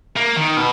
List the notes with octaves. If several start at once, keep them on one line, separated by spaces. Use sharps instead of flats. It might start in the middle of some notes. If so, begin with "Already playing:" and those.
A#3
D#3
B2